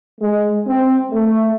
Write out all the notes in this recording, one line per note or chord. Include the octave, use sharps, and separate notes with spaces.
G#3
C4
A3